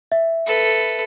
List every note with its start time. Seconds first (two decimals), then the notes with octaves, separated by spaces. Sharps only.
0.12 E5
0.46 A4 B4